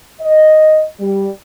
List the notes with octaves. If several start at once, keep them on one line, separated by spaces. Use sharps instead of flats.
D#5
G3